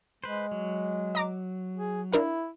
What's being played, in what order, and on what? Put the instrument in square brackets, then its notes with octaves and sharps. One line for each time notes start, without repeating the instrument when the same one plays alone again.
[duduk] G#3 [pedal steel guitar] B4 C5
[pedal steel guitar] F#3
[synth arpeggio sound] D#5 A#5 D6
[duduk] G#4
[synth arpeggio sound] D4 A#4 F5 [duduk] E4